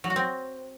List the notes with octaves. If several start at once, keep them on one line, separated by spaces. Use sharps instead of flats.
F#3
F#4
C4